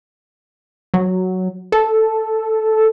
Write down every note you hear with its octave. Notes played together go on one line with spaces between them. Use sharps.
F#3
A4